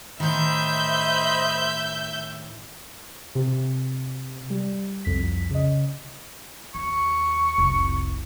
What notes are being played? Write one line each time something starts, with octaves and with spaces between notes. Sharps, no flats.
A2 D#3 C5 D#5 E5 B5 G6
C3
G3
C2 F2 B6
C#3 D#5
D#2 C#6
F1 C2